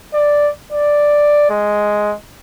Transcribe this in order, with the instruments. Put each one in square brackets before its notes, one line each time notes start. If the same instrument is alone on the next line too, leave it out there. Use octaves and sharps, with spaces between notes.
[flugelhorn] D5
D5
G#3